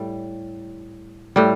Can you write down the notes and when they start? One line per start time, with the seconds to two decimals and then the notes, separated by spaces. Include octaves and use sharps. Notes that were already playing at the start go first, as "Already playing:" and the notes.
Already playing: A2 G3
1.36 A2 G3